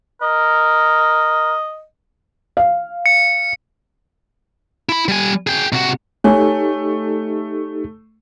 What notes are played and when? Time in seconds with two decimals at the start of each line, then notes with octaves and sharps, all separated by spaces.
0.22 A#4 D#5
2.57 F5
3.06 C#7
4.89 E4 B5
5.08 G3 G#5
5.47 G#4 G5
5.73 C3 F#4
6.24 A3 D#4 G4 A4 C#5 G#5